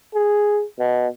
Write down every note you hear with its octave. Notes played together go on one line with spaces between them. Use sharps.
G#4
B2